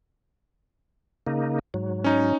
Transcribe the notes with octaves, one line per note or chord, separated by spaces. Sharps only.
C#3 A#3 D#4
G#2 F#3
C#4 D#4